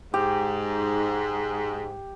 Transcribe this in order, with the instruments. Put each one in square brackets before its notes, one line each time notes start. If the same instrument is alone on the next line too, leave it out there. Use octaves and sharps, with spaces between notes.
[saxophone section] G#2 [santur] G4